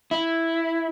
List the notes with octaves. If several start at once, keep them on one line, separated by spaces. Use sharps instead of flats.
E4